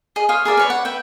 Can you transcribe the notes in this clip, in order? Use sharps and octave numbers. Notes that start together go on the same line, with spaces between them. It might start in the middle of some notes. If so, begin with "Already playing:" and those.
G#4 D#5
C5 C#5 F5 D#6
G#4 A#4 D5 E5
B4 C#5 D5
F#5
B4 E5 G5